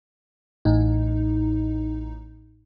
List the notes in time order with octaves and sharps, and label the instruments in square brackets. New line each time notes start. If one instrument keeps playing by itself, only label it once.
[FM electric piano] A1 A2 D#4